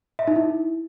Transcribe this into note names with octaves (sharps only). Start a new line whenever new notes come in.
E5
D#4
E4